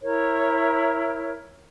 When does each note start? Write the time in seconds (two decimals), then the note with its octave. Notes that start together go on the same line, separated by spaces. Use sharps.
0.02 E4 A#4 C#5